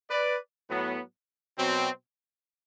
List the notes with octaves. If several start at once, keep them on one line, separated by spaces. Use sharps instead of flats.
B4 D5
A2 F#3 B3
B2 F#3 C4